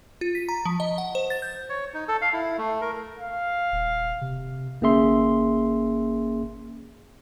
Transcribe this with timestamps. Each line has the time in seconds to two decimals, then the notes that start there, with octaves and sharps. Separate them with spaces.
0.21 F4
0.35 B6
0.49 A#5
0.65 F3
0.80 D#5
0.98 F#5
1.15 C5
1.30 A6
1.42 G6
1.69 C#5
1.94 D#4
2.08 A4
2.22 F5
2.33 E4
2.58 A3
2.81 A#4
3.17 F5
3.72 D#1
4.21 C3
4.81 G1 A#3 C#4 G#4 E5 C6